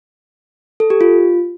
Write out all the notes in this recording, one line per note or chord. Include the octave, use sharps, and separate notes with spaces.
A4
G4
F4